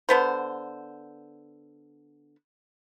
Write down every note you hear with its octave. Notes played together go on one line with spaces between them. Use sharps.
D3 B3 C5